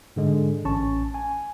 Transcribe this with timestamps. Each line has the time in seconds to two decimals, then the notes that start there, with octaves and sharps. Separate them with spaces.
0.16 G#2 D3 G#3
0.65 A1 C#4 A5 C#6
1.14 G#5